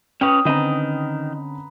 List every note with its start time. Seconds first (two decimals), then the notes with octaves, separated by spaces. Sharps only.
0.21 C#4 B4 C#5 G5 D#6
0.45 D3 D#3 C4 C#4 B4 D#5 A#5